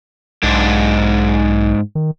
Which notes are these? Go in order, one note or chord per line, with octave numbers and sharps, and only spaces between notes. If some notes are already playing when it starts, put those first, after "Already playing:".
B1 G#2 D4
D#3